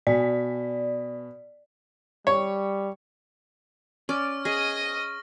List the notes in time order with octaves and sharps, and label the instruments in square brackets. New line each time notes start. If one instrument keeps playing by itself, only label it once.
[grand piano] B2 [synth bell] D5
[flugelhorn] G3 [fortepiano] C#5
[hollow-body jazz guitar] C#4 [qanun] D5 [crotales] C#6 F6
[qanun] G#4 [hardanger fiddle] D#5 D#6 [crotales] A#6